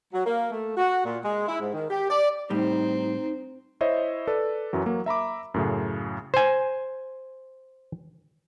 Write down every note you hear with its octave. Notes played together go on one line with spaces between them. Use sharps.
F#3
A#3
A3
F#4
A#2
G#3
E4
G#2
D#3
G4
D5
A2 G3 C4 D#4
E4 C5 C#5 D#5 E5
A4 B4 D5
F#2 E3 F#3
F#3 A#3
E5 A#5 B5 D6
F#2 A2 C#3
C5 G#5